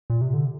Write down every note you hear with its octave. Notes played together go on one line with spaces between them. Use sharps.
A#2
C3
D3